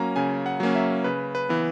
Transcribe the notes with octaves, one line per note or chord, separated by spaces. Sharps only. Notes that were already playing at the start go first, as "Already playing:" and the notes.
Already playing: F#3 A#3 C#4 A#5
C#3 G#5
F#5
F#3 A#3 C#4
E5
C#3 B4
B4
E3 B3